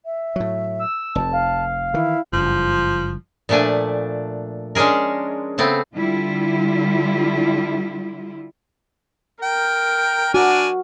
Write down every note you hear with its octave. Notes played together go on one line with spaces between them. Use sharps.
E5
A2 F#3
E6
F1 F2 A5
F5
D#3 E3 E4
F#1 G2 F3
A#2 F3 A3 D4 G#5
G#3 C#4 D4 G#4 A#4
C#3 A3 B3 C4
D3 G3 E4 F4
A#4 G5
D4 F#4 G#5